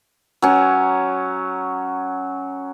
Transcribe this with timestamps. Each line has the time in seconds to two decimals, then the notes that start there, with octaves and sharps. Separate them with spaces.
0.42 F#3 C#4